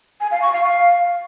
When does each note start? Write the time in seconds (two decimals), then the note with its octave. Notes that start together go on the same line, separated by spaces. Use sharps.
0.21 G#5
0.31 F5
0.42 C#6
0.53 F5
0.63 F5